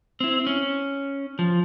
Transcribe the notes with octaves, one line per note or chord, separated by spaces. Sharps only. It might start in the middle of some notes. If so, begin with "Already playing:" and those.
C4 E4
C#4
F3